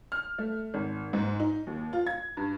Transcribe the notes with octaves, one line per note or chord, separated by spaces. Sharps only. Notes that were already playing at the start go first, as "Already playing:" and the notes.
F6
A3
G#1
G#2
D#4
D#2
F4
G#6
G2